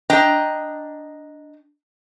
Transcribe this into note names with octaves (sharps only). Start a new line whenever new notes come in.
D4 D#5 G5 A#5